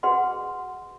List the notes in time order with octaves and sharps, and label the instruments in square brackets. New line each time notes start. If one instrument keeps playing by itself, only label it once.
[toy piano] F#4 G#4 B4 D#5 F#5 C6